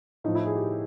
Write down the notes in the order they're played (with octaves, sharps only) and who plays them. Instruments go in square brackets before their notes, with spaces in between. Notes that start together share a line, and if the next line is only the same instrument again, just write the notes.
[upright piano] A2 F3 D#4
E4
G#4
G4